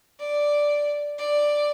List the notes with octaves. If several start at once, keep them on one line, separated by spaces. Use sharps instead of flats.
D5
D5